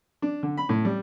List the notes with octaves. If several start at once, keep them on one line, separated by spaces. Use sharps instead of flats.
D4
D3
B5
A2
G3